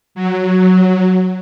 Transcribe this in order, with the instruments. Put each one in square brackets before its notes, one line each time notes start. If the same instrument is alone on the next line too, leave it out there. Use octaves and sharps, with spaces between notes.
[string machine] F#3